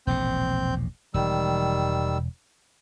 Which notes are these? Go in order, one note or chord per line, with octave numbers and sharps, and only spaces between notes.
E1 A#1 A2 C4 G6
E1 D#3 G3 E6